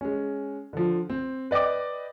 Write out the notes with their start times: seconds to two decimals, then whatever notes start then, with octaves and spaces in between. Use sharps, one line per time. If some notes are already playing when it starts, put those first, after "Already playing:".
0.01 G#3 C#4
0.73 D3 F3
1.10 C4
1.51 B4 D5 D#5 G5 D6